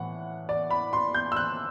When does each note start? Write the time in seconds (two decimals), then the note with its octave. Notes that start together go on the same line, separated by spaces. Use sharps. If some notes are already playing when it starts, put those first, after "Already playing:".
Already playing: A2 E3 F#5
0.49 D5
0.70 B5
0.93 C6
1.14 G6
1.32 E6
1.37 F#6